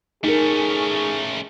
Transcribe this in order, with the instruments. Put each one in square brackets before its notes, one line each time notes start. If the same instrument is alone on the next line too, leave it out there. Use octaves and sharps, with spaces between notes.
[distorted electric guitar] A3 C#4 [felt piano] D#4 A#4 [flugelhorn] G#4